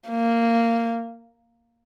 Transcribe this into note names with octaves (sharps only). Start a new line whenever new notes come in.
A#3